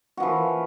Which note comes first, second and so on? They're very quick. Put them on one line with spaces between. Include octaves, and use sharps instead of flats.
F#4 F3 E3